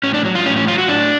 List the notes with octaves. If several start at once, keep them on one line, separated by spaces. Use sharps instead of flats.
A2 C#4
D4
F#3
F4
A2 C#4
C#4
F#3 F4
F#4
A2 D4